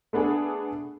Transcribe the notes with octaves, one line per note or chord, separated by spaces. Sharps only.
A3 B3 D4 G#4 A4